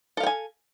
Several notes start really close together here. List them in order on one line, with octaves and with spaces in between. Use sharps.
A4 F5 G5 G#5